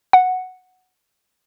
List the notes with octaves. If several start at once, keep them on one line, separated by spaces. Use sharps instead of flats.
F#5